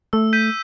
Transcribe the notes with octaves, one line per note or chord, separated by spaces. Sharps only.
A3 E6
G6 B6 D#7